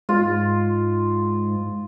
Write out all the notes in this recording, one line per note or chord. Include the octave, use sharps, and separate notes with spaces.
G#2 F4